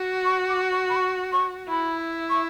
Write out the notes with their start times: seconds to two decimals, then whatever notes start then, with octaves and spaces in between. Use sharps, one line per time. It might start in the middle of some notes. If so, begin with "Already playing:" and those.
Already playing: F#4
0.25 C#6
0.49 D6
0.72 C#6
0.90 B5
0.96 C#6
1.32 C#6
1.68 E4 B5
2.30 C#6